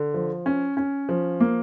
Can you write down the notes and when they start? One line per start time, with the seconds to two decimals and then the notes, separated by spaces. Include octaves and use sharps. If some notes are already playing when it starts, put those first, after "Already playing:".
Already playing: D3
0.14 F3
0.46 C#4
0.77 C#4
1.09 F3
1.40 A#3